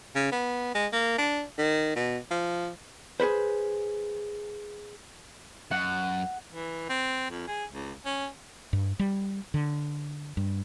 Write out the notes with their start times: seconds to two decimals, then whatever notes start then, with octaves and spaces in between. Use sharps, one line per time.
0.15 C#3
0.32 B3
0.75 G#3
0.93 A#3
1.18 D4
1.58 D#3
1.96 B2
2.31 F3
3.20 G#4 A4 B4 C5
5.71 F#2 F#5
6.53 E3
6.89 C4
7.31 F2
7.48 G#4
7.71 C#2
8.05 C#4
8.73 G2
8.99 G3
9.54 D3
10.37 G2